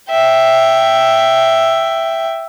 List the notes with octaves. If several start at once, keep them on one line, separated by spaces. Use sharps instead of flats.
E5 G5